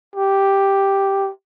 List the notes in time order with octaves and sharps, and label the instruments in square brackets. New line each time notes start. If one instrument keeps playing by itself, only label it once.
[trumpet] G4